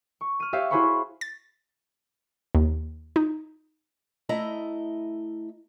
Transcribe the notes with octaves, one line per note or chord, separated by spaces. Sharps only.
C#6
F6 D#7
G4 C#5 E5 F5
E4 F#4 G#4 C5 B5 C#6
A6
D#2
D#4
A3 E4 D#5 A#5